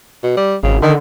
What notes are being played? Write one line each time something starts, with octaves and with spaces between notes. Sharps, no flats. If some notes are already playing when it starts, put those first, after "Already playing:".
B2
G3
G#1 C#3
D3 D#3